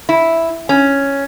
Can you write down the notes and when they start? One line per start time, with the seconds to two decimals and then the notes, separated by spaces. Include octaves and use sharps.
0.09 E4
0.69 C#4